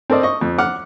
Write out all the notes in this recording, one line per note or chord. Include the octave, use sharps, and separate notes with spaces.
C4 A4 A#4 D5 D#5
D#5 C#6
F2
F#5 D6 F6